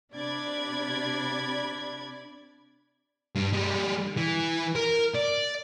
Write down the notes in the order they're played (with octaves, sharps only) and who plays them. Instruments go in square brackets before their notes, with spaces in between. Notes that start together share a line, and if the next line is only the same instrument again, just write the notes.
[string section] C3 D5 B5 [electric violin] D4 G#6
[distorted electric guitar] G2
G3 G#3
E3
A#4
D5